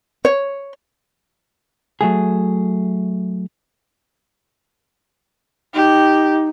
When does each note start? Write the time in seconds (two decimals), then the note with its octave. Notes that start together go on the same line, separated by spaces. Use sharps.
0.25 C#5
2.01 F#3 A3 G#4
5.74 D#4 G4